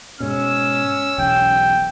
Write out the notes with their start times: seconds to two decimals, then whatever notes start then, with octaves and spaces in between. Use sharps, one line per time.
0.20 G#2 B2 C#4 E6
1.18 E1 B1 E2 G5